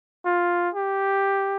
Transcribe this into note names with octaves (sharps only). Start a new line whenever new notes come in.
F4
G4